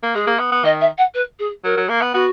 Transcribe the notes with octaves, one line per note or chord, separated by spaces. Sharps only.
A#3
G#3 G#4
A#3
B3
B3
D#3 D#5
E5
F#5
B4
G#4
F#3 A#4
F#3
A#3
B3
B3 F#4